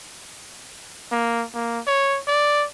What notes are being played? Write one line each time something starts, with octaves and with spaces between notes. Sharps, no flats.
A#3
A#3
C#5
D5